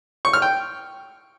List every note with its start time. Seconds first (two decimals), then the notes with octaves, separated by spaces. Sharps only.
0.25 C#6
0.33 F6
0.42 G5